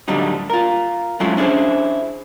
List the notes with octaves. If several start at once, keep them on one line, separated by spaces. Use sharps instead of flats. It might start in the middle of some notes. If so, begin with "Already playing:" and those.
A2 D3 F#3 G3 D#4
F4 A#4
F#3 G#3 A3 C#4 E4 F4
C#4 D4 E4 G#4 C5